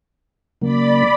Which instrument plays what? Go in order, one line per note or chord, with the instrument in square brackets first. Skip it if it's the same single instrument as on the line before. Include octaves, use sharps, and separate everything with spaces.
[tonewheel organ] C#3 F#3 A#3 [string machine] D5 B5